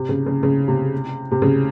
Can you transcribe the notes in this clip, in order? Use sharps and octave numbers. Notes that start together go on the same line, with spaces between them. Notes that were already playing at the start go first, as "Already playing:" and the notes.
Already playing: C3
C#3
C#3
C#3
C3
C3
C#3